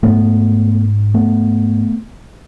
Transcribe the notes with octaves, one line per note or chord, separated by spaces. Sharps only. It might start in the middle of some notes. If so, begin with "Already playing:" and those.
G#2 A3 B3
A3 B3